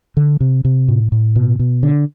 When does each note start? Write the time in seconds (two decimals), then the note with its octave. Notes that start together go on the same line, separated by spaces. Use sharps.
0.17 D3
0.40 C3
0.65 C3
0.88 A2
1.12 A2
1.36 B2
1.59 B2
1.83 D3